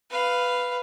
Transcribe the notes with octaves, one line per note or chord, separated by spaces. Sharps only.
B4 F5